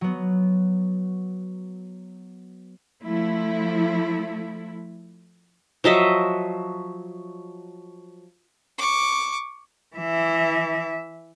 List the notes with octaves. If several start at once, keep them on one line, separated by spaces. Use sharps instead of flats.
F#3 B3
F3 A3 E4
F3 F#3 D#5 E5
C#6 D6
E3 E5